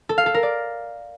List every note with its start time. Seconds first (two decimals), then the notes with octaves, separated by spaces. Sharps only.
0.09 A4
0.18 F5
0.26 A4
0.34 A#4
0.43 D5